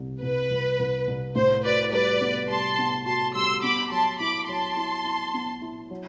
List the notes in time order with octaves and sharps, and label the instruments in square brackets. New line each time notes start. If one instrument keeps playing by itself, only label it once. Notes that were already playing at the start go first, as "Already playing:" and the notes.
Already playing: [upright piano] C2 C3 G3
[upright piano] C2 [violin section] B4
[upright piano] C2
C2
C2
[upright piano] A2 [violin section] C5
[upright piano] F#4 [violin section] B4 D5
[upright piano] G3 [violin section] B4 D5
[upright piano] B3
[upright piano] G3 [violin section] A5 C6
[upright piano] B3
[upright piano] F#4 [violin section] A5 C6
[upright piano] G3 [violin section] C6 E6
[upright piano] B3 [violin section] B5 D6
[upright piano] F#3 [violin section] A5 C6
[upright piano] E4 [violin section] B5 D6
[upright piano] F#3 [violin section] A5 C6
[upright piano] E4
E4
B3
E4
F#3